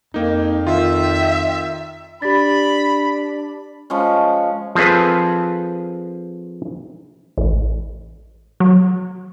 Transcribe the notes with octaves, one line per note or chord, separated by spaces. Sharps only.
F2 A#3 D#4
D#3 F4 E5
D4 G4 B5 A6
F3 G#3 C#4
F3 C4 G#4 A4 B4
A1
F#3